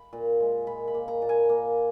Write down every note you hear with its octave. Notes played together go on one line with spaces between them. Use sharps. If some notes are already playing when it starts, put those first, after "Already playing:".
Already playing: B5
A#2
G#3
A#2 B5
B5
A#3
A#5
A#2
G#5
A#3